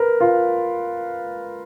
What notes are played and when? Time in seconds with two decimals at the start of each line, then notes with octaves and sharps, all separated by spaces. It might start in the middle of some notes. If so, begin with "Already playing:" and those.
Already playing: A#4 B4
0.21 F4